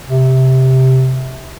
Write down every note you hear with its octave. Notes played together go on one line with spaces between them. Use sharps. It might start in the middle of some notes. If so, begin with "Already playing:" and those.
C3